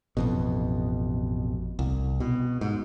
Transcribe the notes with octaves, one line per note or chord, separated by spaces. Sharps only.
A1 F2 B2
C2
B2
G#2